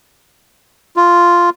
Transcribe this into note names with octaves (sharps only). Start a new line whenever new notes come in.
F4